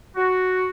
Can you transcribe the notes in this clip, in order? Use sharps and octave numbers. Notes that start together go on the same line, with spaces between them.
F#4